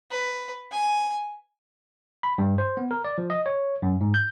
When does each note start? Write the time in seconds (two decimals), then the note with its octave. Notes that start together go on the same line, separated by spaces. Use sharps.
0.11 B4
0.72 G#5
2.23 B5
2.38 G2
2.58 C5
2.77 B3
2.91 A#4
3.04 D5
3.18 F3
3.30 D#5
3.46 C#5
3.82 F#2
4.01 G#2
4.14 G6